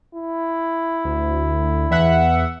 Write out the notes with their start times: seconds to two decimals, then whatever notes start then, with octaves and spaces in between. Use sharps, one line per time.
0.15 E4
1.04 D2
1.91 E2 E5 F#5